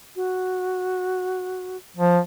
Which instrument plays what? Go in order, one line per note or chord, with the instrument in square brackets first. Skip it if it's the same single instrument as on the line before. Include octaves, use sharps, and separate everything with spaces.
[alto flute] F#4
[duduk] F3